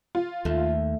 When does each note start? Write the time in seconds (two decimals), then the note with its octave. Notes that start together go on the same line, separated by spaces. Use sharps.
0.15 F4
0.45 D#2 A3